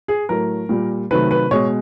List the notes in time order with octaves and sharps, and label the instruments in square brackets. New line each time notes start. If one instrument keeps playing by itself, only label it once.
[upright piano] G#4
A2 F#3 A3 A#4
A#2 G3
C3 D#3 F#3 A3 B4
B4
B2 G#3 C#5